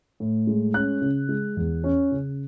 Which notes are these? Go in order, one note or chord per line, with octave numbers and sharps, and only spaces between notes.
A2
G#3
C#4 F#6
C#3
G#3
E2
C#4
C#3